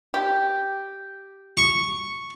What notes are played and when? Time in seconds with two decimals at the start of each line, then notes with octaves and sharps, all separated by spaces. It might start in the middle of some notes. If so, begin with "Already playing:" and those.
0.14 G4
1.57 C#6